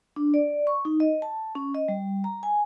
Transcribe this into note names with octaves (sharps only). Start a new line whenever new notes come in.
D4
D5
C#6
D#4
D#5
A5
C#4
D#5
G3
A#5
G#5